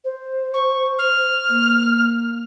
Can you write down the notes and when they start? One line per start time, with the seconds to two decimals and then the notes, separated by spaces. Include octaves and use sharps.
0.04 C5
0.54 C#6
0.99 F6
1.49 A#3